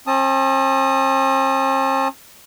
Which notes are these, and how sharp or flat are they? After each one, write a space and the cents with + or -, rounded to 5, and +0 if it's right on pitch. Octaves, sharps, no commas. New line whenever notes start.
C4 +45 A5 +0 D#6 +0